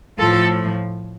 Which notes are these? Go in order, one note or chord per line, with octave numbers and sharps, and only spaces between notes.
A2 F3 F4 A4